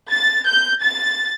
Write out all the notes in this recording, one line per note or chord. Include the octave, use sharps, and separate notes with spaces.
A6
G6
A6